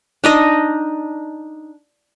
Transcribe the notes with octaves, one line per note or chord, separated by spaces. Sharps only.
D4 D#4 D#5